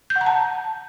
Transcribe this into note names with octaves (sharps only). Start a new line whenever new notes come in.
G6
F#5
A#5
A5